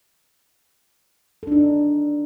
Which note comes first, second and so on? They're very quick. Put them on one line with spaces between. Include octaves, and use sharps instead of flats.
A4 D4 D#4